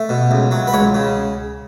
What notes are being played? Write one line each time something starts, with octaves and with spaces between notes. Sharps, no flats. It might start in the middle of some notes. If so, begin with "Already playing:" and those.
Already playing: A3
B2
C#2
F#3
B4
C#2 C#5
C#3